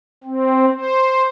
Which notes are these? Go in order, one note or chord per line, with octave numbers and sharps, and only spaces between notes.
C4
C5